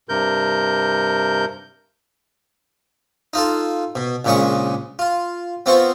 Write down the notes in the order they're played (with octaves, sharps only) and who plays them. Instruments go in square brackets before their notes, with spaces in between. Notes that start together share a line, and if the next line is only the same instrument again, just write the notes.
[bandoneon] G2 C3 A#4 G6
[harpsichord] D#4 F4 A4
B2
A#1 A#2 C#3 G#3 C#6 D#6
F4
B3 C4 F4 C6 C#6